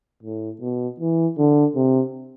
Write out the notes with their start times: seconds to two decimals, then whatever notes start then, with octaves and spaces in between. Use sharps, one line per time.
0.23 A2
0.61 B2
1.00 E3
1.38 D3
1.76 C3